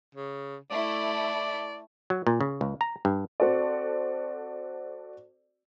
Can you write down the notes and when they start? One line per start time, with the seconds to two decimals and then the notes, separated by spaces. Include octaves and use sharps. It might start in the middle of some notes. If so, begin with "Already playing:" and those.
0.15 C#3
0.71 A3 E4 D5
2.10 F#3
2.27 A#2
2.41 C#3
2.61 C#2
2.81 A#5
3.05 G2
3.40 C4 F#4 A4 D5